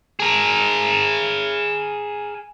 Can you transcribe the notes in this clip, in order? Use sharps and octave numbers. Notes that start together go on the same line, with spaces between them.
G#4 A#4